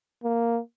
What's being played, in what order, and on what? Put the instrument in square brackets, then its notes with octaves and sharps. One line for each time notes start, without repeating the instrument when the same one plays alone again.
[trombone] A#3